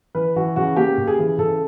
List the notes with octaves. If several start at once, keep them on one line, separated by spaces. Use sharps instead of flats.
E3 B4
E3 F#4
C#3 F#4
A#3 G4
C#3
G#4
E3
C#3 A4